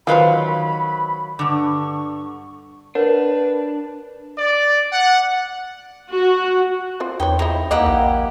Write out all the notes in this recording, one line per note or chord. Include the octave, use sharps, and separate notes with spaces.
D#3 F#3 F4 B4 C5 F5 B5
G2 D3 C#6
D4 A#4 B4 C#5 F#5
D5
F#5
F#4
C4 F4
E2 D#4 B4 C#5 G5
F3 G#3 D#4 E4
D#2 A#3 D#4 E4 G4 D#5 F#5
A#1 F3